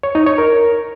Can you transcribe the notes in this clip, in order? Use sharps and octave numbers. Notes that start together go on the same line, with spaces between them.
C#5
D#4
C#5
A#4